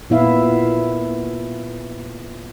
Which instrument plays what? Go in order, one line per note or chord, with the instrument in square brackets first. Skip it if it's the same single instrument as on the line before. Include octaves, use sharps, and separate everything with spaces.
[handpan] A#2 B3 E4 E5 F5